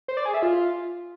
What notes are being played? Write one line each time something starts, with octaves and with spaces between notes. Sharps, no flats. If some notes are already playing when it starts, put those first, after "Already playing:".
C5
D5
G#4
E5
F4